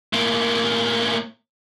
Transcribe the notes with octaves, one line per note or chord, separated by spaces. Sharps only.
A2 A#3